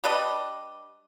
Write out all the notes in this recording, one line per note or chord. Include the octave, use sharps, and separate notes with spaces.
G3 D4 B4 D#5